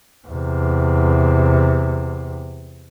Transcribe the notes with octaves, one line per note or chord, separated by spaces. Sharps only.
E2 C3